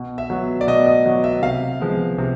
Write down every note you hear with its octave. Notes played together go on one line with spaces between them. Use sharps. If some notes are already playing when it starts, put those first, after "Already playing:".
Already playing: B2
E5
F#3 B3
D5
B2 D#5
D#5
F#3 B3
E5
C3 F5
F3 G#3 B3
C3